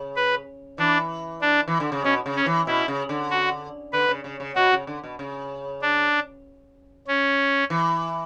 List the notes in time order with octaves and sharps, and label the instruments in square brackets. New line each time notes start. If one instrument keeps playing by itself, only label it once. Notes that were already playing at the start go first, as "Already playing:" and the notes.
Already playing: [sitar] C#3
[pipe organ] B4
[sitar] E3 [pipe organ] D4
[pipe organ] D4
[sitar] E3
D3
C#3
[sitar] B2 [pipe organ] C#4
[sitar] C#3
[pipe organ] C#4
[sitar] E3
[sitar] B2 [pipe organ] E4
[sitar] C#3
D3
[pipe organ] F#4
[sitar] D3 [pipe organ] B4
[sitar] C#3
C#3
C#3
[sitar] B2 [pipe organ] F#4
[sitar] C#3
D3
B2
C#3
[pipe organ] D4
C#4
[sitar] E3